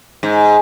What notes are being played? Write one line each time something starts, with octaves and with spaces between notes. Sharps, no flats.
G#2